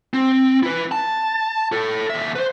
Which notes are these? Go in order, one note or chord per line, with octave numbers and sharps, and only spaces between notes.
C4
E4 B4
A5
A4 C#5
D#2 E5
B4 C5